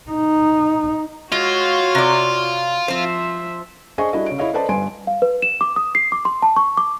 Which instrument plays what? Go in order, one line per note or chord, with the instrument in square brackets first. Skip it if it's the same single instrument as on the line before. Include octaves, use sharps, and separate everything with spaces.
[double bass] D#4
[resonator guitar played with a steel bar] G#3 [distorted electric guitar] F4 [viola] F#4 C#5
[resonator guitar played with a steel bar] C3 D5
[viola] F3 E5 [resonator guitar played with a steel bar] C4 C5
[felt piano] D4 G#4 C5 D#5 G#5 C#6
G3 D4 E4 F#4 A4 D#5
C#3 C#5 D7
E4 G#4 C#5 D#5 F5
A4 B4 C5 D5 D#5 A5
G1 G2 B4 G#5 C6 D7
[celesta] F5
B4
E7
D6
D#6
C7
D6
C6
A5
C#6
D6